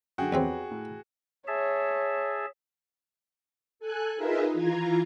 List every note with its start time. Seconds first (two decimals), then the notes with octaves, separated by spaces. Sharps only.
0.18 F#2 D3 F#4 G#4 G5
0.32 E2 F3 C4 G4 B4 C#5
0.71 A2
1.48 G#4 C#5 E5 A5
3.80 A4 G#5 F#6
4.16 D#4 F4 G#4 A#4 B4 E5
4.54 E3 F4 A#5 G#6